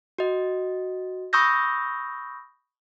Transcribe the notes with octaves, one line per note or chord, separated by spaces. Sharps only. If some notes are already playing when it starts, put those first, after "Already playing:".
F#4 D#5
B5 C#6 D#6 E6 G6 A#6